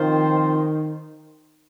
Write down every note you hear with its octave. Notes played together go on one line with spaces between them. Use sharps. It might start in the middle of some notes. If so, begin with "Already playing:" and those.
Already playing: D#3 F3 C4 F4 C5